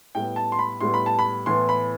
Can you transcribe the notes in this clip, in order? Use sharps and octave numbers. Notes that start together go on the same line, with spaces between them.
A2 G3 B3 G5
A5
C6
B5
A2 G3 B3 C6
B5
A5
B5
A2 E3 B3 C6
B5